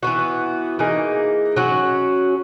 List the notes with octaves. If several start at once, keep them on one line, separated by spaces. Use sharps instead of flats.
E3 B3 F#4
E3 A#3 D#4 G#4
F#3 C#4 F#4